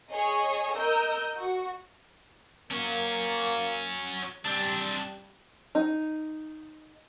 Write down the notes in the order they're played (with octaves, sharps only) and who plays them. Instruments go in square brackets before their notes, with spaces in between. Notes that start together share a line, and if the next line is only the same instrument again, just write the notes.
[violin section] G#4 C#5 D#5
A#4 D#5 E6 G6
F#4
[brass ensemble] A#3 [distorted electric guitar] C#4 F#4
[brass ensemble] G3 [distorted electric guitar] C4 D4
[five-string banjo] D#4